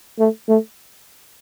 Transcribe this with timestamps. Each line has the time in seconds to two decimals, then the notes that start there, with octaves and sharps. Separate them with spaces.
0.19 A3
0.48 A3